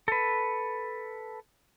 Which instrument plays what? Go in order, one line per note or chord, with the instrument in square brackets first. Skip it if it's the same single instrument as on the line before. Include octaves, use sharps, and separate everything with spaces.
[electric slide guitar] A4 B4